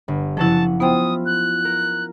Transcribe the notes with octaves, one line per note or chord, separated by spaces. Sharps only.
G1
F#1 F3 E4 F#4 F#5 A5
B3 E4 F4 C5 G5 D#6
F#6
A#4